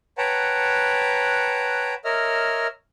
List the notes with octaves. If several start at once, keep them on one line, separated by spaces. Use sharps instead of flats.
B4 C#5 F#5 G5 A5 A#5
A#4 C#5 D#5 E5 F6